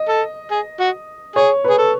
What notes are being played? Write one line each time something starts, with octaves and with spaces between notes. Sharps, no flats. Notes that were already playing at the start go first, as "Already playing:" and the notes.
Already playing: D#5
A4
G#4
F#4
G#4 C#5
B4
G#4
A4